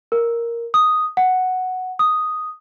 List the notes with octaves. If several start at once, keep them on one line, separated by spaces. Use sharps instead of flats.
A#4
D#6
F#5
D#6